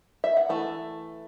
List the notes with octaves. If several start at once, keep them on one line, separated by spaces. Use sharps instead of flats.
E5
F#5
E3 A3